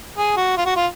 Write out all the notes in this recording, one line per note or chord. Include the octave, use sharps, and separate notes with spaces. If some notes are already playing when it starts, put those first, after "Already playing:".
G#4
F#4
F4
F#4
F4